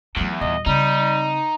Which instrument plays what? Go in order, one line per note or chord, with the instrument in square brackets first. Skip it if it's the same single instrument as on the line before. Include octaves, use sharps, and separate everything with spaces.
[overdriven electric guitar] E2 [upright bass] F#3 A3
[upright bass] D#1 [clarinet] D#5
[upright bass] C#3 C4 [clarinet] G3 [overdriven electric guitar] D#4